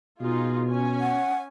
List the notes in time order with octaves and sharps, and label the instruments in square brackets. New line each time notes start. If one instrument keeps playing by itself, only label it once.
[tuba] B2 [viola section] D#4 F4 G#4
[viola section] C#4 G#5
[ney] F#5